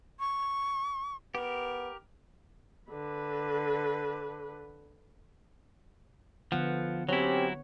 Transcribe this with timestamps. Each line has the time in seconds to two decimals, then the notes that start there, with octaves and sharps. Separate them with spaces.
0.20 C#6
1.35 B3 G4 A#4
2.91 D3 B4
6.52 D3 F3 B3 F#5
7.09 F#3 C4 C#4 E4 G4 C#5